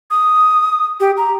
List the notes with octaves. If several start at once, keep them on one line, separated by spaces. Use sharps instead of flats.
D#6
G4
A#5